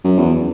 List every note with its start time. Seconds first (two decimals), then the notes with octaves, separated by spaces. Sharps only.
0.04 F#2
0.18 E2